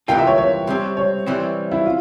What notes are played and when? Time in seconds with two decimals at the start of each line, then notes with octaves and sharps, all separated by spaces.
0.08 C2 C3 E3 A#3 F4 G5
0.18 E5
0.27 C#5
0.38 C#5
0.67 C3 G3 C4
0.97 C#5
1.27 C3 E3 G3 C4
1.71 E4
1.86 F4